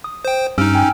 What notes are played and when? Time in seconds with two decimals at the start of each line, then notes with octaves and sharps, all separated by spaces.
0.04 D#6
0.25 C5 G5
0.58 G2 C#4 D#4 E6 F6 D7
0.75 G5 G#5